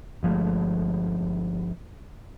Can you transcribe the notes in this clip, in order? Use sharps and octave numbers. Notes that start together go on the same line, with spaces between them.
G1 F3 G#3 A3